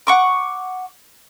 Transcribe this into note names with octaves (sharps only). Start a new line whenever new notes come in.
F#5 C#6 D6